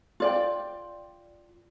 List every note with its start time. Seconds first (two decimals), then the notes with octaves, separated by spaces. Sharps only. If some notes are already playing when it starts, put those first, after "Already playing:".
0.20 F4 D5 G5